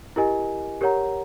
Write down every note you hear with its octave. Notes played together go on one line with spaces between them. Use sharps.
E4 G4 A#4 D#5 G#5
G4 A#4 C#5 F#5 A#5